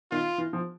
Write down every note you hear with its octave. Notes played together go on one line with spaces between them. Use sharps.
D#3 F4
E3
F3